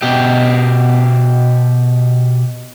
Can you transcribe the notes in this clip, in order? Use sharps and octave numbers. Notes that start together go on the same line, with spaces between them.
B2 G4